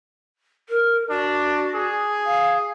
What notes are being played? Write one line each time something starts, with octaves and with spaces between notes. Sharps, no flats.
A#4
D4 F#4
G#4
F5